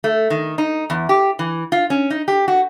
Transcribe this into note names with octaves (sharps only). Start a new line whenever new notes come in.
A3
D#3
D#4
E2
G4
E3
F4
C#4
D#4
G4
F#4